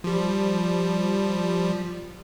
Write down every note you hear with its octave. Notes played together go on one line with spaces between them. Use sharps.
F3 G3